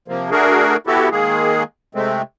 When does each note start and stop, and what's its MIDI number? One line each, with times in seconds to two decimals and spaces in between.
0.08 0.30 48
0.08 0.30 53
0.08 0.30 58
0.31 0.76 57
0.31 0.76 62
0.31 0.76 66
0.31 0.76 68
0.31 0.76 70
0.87 1.09 59
0.87 1.09 64
0.87 1.09 66
0.87 1.09 67
0.87 1.09 69
1.11 1.63 51
1.11 1.63 56
1.11 1.63 58
1.11 1.63 68
1.95 2.22 48
1.95 2.22 56
1.95 2.22 57
1.95 2.22 60